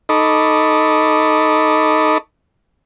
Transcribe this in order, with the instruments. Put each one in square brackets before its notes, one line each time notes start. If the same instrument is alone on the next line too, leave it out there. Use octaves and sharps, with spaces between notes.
[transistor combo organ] D#4 A4 D#5 B5 C#6 D6